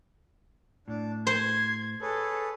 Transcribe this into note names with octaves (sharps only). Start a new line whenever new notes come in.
A2 D4
C5 C6 G#6
G#4 A4 B4 C#5